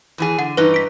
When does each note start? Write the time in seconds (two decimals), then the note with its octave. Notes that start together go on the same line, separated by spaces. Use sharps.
0.18 E2 E3 G#4
0.39 D3 F#5
0.57 G2 E3 D#4 B4
0.74 B6 D7